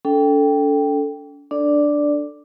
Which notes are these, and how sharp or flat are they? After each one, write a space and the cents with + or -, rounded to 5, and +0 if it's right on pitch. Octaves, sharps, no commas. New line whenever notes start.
D4 -45 A4 +0 G5 +0
D4 +0 A4 +15 D5 +0